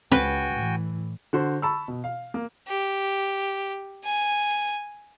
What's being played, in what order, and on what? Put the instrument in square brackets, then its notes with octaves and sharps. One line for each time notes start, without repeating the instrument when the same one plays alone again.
[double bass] C#2 [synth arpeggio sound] C4 C6 [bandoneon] F#4 G5 G#5 [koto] B4
[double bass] A2 E3
[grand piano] D3 F#4 C5
A5 B5 C#6 E6
B2
F5
A#3
[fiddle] G4
G#5